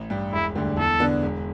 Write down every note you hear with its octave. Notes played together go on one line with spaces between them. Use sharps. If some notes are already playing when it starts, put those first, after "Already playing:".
Already playing: A1
G2 G3
E1 E4
D2 D3 G3
E2 A4
D3 B3 D4
E1